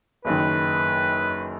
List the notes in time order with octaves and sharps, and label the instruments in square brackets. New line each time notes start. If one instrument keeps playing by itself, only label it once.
[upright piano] F#1 F#2 D#3 [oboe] B4